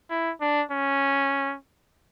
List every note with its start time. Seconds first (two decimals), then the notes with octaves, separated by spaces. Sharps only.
0.10 E4
0.41 D4
0.71 C#4